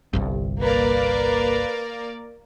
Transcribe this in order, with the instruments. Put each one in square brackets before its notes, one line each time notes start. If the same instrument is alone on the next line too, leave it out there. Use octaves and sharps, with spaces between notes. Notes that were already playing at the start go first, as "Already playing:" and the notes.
[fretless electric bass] G1 C2 G2
[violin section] A#3 A#4 D5 [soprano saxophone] B4